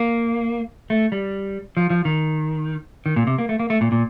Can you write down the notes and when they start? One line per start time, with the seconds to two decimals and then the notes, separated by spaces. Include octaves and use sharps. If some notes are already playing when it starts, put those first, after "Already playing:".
Already playing: A#3
0.90 A3
1.12 G3
1.77 F3
1.90 F3
2.05 D#3
3.06 D#3
3.16 A#2
3.27 C3
3.38 A#3
3.49 A3
3.59 A#3
3.70 A3
3.81 A#2
3.92 A#2